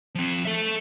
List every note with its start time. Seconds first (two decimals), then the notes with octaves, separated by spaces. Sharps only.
0.15 F3 C4
0.45 A4 E5